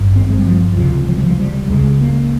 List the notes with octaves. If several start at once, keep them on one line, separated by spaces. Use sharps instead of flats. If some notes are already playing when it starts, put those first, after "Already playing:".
Already playing: G#1 G2
C4
G#3
G3
F3
C#2 C3 F3
F3
G3
F3
G3
C#2 C#3 G#3
A#3